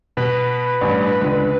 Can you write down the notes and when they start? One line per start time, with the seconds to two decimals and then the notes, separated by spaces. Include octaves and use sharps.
0.17 B2 B4
0.81 A1 G2
1.21 C#2 D3